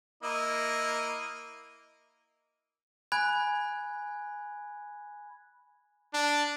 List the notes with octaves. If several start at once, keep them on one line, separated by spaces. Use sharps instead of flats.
A#3 E4 D#5
G#5 B5 F#6 G#6
D4